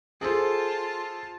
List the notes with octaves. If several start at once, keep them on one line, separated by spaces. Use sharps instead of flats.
F4 G#4 A4 C5 A5